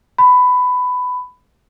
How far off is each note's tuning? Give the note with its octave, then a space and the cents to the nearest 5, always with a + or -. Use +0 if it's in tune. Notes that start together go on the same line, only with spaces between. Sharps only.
B5 +15